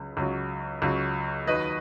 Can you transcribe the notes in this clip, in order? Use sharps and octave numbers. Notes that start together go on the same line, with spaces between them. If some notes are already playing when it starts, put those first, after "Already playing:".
Already playing: C#2 C#3 F#3
C#2 C#3 F#3
C#2 C#3 F#3
D#2 D#3 F#3 B4 D#5